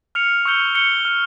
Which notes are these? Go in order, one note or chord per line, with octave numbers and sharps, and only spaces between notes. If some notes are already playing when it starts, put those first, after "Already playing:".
F6 C#7 F7
C#6 E6 G6 C#7 G7
F6 C#7 G7
F6 C#7 G7